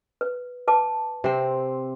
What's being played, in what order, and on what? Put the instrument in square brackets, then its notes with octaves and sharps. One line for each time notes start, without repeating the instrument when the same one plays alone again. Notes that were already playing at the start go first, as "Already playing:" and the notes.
[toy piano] B4
B4 A5 D6
[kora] C3 C4